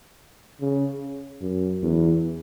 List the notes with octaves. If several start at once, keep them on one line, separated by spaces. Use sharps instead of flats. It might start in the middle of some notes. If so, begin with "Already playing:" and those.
C#3
F#2
E2